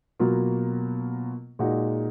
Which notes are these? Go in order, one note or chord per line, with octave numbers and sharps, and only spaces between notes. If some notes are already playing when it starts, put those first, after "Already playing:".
B2 F#3 A#3 F4
A#2 G#3 D#4 F#4